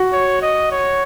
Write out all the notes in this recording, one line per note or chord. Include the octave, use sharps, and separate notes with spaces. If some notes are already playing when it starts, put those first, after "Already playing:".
Already playing: F#4
C#5
D#5
C#5